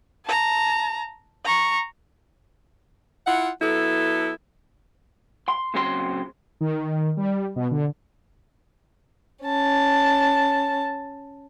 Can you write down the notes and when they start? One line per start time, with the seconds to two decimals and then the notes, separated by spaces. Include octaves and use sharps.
0.25 A5 A#5
1.45 A#5 C#6
3.26 E4 F4 F#5
3.61 F#3 B3 E4 A4
5.48 C6
5.74 A#2 C#3 F#3 C4 A#4 C6
6.61 D#3
7.17 G3
7.56 B2
7.71 D3
9.43 C#4 A5